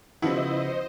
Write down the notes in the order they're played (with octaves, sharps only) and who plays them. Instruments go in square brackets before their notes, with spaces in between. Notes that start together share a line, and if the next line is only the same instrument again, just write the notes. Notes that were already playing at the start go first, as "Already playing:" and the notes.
[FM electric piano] C#3 F#4 [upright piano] F3 B3 [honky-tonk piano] E4 [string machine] C5 D#5